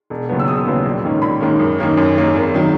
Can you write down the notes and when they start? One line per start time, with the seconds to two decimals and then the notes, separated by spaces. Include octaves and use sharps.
0.10 E1
0.29 D#2 C#3 F#3 B3
0.39 E6
0.47 E1 D#6
0.67 D#2 C#3 F#3 B3
0.85 A#1
1.04 G#2 D#3 A#3 C#4
1.22 A#1 B5
1.41 G#2 D#3 A#3 C#4
1.59 F#2
1.79 D#3 A#3 C#4
1.97 F#2
2.15 D#3 A#3 C#4
2.34 G#1
2.54 D#3 F#3